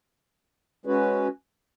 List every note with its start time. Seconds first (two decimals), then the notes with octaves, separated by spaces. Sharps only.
0.86 G#3 C#4 F#4 B4